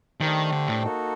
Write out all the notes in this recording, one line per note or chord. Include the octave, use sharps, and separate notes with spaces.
D#3 A3 D4 G4 C5 G5
D3
A2
A#3 D#4 F#4 A4